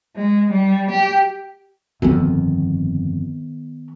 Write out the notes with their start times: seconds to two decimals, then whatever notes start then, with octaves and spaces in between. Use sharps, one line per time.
0.16 G#3
0.52 G3
0.91 G4
2.02 G1 F2 D#3 B3